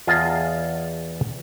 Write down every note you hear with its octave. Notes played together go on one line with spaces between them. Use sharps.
E2 F4 G#4 D#5 A5